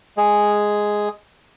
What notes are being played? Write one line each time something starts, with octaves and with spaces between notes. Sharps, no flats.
G#3 G#4